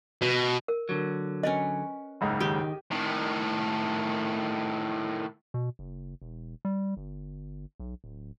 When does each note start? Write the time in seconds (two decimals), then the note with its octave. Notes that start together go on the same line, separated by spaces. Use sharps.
0.21 B2
0.68 A#4
0.89 D3 F#3
1.43 C#4 A#4 B4 D#5
2.21 F#1 C#2 G#2
2.40 D#3 G4 G5
2.91 A2 D#3
5.54 B2
5.79 F#1
6.22 E1
6.65 G3
6.97 G1
7.80 B1
8.04 D1